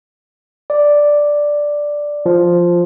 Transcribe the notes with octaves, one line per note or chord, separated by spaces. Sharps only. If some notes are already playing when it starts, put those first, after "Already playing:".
D5
F3